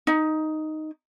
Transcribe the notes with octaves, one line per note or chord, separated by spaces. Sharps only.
D#4